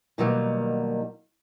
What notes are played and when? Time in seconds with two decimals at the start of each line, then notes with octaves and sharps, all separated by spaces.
0.18 B2 D3 D#3 F#3 G3 A#3